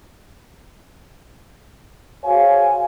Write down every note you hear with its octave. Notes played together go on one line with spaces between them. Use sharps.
F#4 G#4 C5 C#5 F5 G#5